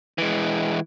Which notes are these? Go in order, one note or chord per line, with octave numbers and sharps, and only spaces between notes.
E3 G#3